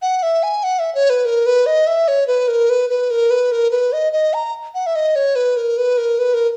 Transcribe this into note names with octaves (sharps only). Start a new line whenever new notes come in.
F#5
E5
G#5
F#5
E5
C#5
B4
A#4
B4
D#5
E5
C#5
B4
A#4
B4
B4
A#4
B4
A#4
B4
D#5
D#5
A#5
F#5
E5
D#5
C#5
B4
A#4
B4
A#4
B4
A#4